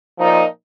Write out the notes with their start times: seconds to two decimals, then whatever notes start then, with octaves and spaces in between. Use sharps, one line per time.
0.19 A#2 F3 D#4